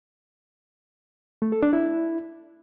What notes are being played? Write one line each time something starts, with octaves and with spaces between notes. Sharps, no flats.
A3
A4
D4
E4